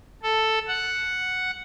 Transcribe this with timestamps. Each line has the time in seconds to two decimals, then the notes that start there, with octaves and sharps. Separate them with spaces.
0.23 A4
0.68 F#5